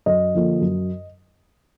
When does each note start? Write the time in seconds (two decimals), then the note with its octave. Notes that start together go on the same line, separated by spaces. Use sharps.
0.06 F#2 D#5
0.34 D3 F3 A#3
0.61 F#2